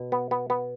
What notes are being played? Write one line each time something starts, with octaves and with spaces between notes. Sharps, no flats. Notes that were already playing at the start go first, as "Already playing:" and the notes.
Already playing: B2
B3
B3
B3